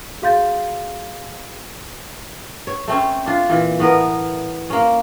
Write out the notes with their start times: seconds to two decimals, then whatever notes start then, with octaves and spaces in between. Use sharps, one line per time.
0.22 F#4 G#4 F5 C6 G6 A6
2.67 C#5
2.88 A3 C4 C#4
3.26 D4 F4
3.49 A#2 E3
3.79 A2 B3 A#4
4.70 A#3 C#4